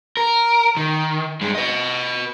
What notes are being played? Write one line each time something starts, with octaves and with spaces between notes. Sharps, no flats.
A#4
D#3
G2 G#3
B4 D#5